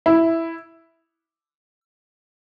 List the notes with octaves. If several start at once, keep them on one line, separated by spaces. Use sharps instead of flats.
E4